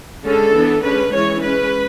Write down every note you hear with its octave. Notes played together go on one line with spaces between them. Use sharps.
D3 G#3 C#4 A4
E3 B3 D4
D3 G#3 C#4 B4
E3 G#3 C#4 C#5
G#3 C#4 B4